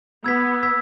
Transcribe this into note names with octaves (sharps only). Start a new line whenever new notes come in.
B3 E6 G#6 B6
E6 G#6 B6